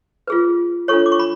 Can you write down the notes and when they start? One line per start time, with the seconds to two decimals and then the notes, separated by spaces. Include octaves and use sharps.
0.27 F4 G#4 B4
0.88 D4 F4 A4 C#5 C#6
1.06 D6
1.12 C#6
1.19 B5